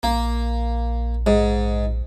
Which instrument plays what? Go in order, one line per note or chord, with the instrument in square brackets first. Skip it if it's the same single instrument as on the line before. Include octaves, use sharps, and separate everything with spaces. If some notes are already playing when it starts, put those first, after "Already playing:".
[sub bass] A#1 [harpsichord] A#3
[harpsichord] G#2